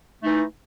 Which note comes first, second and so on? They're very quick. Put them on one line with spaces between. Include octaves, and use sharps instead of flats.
A3 D#4 E3